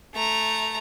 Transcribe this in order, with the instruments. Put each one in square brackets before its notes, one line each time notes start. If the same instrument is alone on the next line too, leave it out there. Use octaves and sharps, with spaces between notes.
[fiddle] A3 A#5